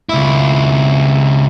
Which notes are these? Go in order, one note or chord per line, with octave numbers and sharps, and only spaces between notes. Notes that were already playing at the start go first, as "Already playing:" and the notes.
C#2 E4